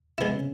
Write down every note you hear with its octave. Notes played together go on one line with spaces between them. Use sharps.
C3 G#3 B3 C4 E4
C#3 C#4